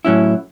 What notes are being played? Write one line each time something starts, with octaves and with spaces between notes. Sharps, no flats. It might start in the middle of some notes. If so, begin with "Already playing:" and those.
A2 F#3 C#4 E4